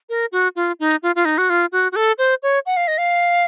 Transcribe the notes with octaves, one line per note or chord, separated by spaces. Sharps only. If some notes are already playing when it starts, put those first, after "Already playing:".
A#4
F#4
F4
D#4
F4
F4
D#4
F#4
F4
F#4
F#4
A4
C5
C#5
F#5
F5
D#5
F5